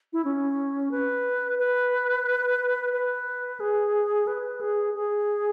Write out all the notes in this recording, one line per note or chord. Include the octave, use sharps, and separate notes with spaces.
E4
C#4
B4
B4
B4
G#4
B4
G#4
G#4